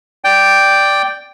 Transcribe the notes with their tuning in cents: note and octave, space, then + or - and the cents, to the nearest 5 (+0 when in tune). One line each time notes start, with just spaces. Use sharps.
D5 +0 G5 +0